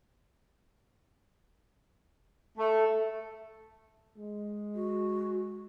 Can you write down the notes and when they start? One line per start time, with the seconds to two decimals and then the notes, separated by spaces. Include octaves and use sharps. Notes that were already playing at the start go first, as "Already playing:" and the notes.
2.58 A3
4.18 G#3
4.75 F#4